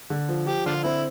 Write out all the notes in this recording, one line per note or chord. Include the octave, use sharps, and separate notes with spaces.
D3
F3
F3 G4
D3 D4 F4
C4 E4